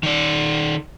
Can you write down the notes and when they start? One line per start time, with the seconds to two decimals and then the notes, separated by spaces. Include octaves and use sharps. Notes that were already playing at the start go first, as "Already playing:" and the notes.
0.03 D#3 D5